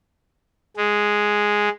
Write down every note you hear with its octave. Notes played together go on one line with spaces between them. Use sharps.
G#3